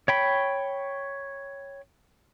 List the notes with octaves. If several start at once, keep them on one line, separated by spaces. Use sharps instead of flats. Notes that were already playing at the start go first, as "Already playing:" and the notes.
C#5 G5 B5